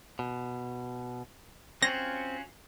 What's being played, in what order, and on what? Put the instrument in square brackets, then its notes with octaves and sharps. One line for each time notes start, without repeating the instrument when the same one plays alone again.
[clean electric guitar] B2
[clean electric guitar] C4 [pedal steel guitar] C#4 F4 F#4 [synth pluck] A#6